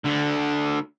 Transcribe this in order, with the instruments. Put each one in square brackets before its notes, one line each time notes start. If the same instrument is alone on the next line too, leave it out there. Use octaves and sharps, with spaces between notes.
[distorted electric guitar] D2 D3